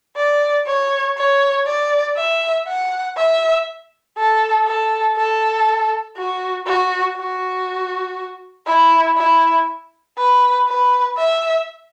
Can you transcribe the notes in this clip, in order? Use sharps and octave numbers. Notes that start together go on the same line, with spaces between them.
D5
C#5
C#5
D5
E5
F#5
E5
A4
A4
A4
F#4
F#4
F#4
E4
E4
B4
B4
E5